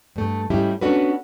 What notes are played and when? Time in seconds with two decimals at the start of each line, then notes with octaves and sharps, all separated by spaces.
0.16 G2 A3
0.50 G#2 G3 C#4 D#4 E4 G4
0.81 B3 C#4 D4 F#4 A4 B4